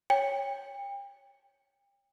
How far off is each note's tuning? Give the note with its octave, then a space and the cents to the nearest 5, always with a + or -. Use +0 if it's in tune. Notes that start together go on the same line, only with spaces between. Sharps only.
C#5 +0 G5 +35